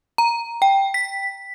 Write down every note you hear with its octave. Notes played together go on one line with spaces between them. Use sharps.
A#5
G5
B6